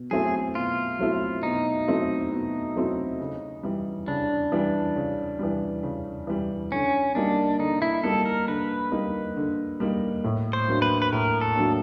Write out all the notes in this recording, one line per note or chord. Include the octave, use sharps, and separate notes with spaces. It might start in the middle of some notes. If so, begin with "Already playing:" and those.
Already playing: B2
F#3 A3 C4 E4 G#4
B2 F4
F#3 A3 C4 E4
B2 D#4
F#3 A3 C4 E4
B2
F#3 A3 C4 E4
C#3
E3 G3
C#3 D4
E3 G3
C#3
E3 G3
C#3
E3 G3
D3 C#4
G3 A#3 D4 D#4
D3 D#4
E4
G3 A#3 D#4 A4
A#4
D3 B4
G3 A#3 D#4
D3
G3 A#3 D#4
A2
C5
F#3 A#3 D4
B4
B4
A2 A#4
A4
F#3 A#3 D4